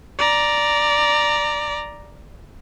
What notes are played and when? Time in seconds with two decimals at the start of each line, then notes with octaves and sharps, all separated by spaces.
0.19 D5 A#5